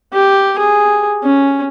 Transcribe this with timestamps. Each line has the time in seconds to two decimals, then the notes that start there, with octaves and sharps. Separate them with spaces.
0.13 G4
0.59 G#4
1.23 C#4